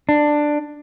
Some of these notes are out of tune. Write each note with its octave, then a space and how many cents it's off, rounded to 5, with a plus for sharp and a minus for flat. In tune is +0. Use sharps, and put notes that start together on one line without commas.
D4 +10